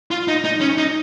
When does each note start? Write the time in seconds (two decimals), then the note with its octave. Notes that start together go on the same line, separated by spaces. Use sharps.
0.11 F4
0.28 D#4
0.44 D#4
0.61 C#4
0.78 D#4